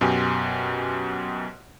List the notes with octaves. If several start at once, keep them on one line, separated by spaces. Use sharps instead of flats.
F#2 B2 G4 G#5 C6